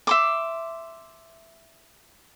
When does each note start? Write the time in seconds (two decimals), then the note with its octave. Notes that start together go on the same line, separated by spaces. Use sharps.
0.07 E5 C6 D6